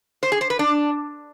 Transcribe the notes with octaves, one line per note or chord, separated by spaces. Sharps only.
C5
G#4
C5
B4
D4